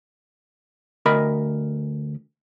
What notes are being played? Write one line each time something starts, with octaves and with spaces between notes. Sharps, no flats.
D2 A#4 D#5 B5